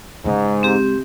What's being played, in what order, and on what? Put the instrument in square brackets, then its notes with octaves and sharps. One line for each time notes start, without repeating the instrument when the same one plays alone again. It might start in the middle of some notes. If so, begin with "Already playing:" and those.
[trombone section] G#2 [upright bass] C#3 G#3
[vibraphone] C4 G4